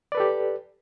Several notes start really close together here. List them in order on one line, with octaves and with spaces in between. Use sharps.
D5 B4 A4 G4